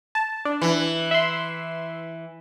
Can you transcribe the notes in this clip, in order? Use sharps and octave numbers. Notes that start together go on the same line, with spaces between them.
A5
D4
E3
E5 C6